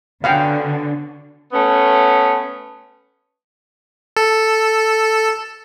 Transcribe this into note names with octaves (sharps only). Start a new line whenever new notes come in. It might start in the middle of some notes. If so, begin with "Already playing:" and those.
D3 B3 C#4 F#4 F5 G5
A3 B3 C#4
A4